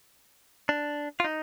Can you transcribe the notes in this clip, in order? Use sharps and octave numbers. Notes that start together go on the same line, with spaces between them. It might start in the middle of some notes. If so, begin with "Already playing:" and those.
D4
F4
D#4